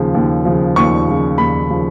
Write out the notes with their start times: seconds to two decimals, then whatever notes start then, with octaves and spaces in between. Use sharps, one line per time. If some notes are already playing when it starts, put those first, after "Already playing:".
Already playing: D#2 C#3 F3
0.15 D#2
0.45 C#3 F3
0.76 D#2 C#6
1.08 C#3 F3
1.38 D#2 B5
1.70 C#3 F3